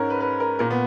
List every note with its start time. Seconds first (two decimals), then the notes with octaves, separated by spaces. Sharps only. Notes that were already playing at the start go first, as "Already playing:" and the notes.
Already playing: G#2 C#4 A#4
0.10 B4
0.20 B4
0.40 A#4
0.59 A#2 A#4
0.71 B3